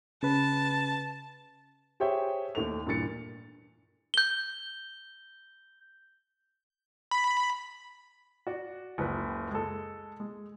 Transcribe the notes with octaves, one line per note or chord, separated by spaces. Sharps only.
C#3 B4 A5
G4 G#4 C5 C#5 E5 G5
D#2 A3 F7
G2 A#2 E3 A6 C#7
G6 G7
B5
F#4 D5
F#1 C#2 B4
G#3 A4
G#3